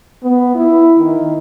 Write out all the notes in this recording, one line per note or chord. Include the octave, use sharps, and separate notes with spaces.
B3
E4
D#3